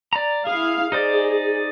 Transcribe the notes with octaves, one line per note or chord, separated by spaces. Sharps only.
D5 A#5
E4 G#4 F5
D#4 G#4 C5 D5